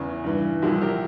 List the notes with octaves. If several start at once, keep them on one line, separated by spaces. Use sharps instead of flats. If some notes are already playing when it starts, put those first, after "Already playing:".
Already playing: E2 C#3 E3
G2 E3
C2 A#2 F3 E4 G4
G4 A#4